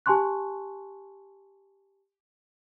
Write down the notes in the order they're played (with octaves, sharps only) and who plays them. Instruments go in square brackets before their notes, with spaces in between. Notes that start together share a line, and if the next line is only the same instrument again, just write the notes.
[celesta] G4 G#5 A5 C6 C#6 F#6